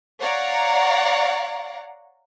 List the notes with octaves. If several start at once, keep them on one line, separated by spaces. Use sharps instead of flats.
C#5 D5 F5 F#5 A#5